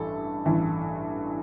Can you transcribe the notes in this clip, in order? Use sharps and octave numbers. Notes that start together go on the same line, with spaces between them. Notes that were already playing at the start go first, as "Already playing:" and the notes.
Already playing: A1 G2 E3 A4
A1 G2 E3